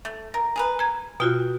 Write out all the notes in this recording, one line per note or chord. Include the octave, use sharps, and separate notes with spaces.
A3
A#4
G#4 A#4 B4
A#5 G#6
B2 F4 F#4 G5